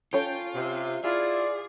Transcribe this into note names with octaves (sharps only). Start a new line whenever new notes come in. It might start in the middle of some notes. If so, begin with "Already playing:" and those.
C#4 F4 A4 C#5 G5
C3
E4 F4 G#4 D5